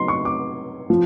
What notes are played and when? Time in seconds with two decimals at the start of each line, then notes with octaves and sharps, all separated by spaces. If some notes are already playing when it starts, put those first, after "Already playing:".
Already playing: C#3 F#3 B3 D#4 C6
0.08 C#6
0.25 D6
0.90 F3